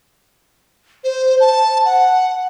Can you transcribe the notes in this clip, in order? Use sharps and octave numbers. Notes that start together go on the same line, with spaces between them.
C5
A5
F#5